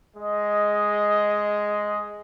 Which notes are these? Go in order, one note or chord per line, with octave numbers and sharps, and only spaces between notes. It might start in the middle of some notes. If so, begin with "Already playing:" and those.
G#3 D#5